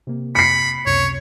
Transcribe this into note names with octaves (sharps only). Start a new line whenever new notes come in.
C3 A#3
B5 C7 C#7
C#2 F#2 C3 C#5